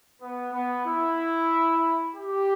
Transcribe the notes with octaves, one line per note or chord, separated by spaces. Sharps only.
B3
B3
E4
G4